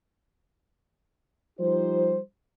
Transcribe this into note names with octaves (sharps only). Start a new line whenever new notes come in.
F3 G3 D#4 G4 C5